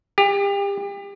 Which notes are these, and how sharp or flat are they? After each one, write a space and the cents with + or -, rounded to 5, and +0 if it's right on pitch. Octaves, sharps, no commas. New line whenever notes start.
G4 +35